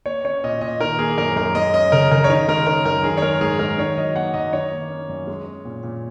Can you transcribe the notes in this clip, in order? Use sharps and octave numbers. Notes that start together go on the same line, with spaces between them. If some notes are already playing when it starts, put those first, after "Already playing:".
A#3 C#5
C#4 C#5
A#2 D#5
A#2 D#5
D#3 A#4
A#3 G#4
F#2 A#4
F#2 A#4
G#3 D#5
C#4 D#5
C#3 A#4
C#3 A#4
C#5
D#3 D#5
G#3 A#4
C#4 A#4
F#2 A#4
D#3 G#4
C#5
G#3 A#4
G#2 G#4
G#2 A#4
D#3 C#5
F#3 D#5
A#3 F#5
F#2 D#5
D#3 C#5
A#3
C#4
F#2
G#3
C#4
A#2
A#2